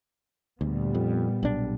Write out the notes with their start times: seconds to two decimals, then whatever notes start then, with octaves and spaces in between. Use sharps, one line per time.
0.61 D2 A#2 G3 B3
0.95 F2
1.43 B1 D4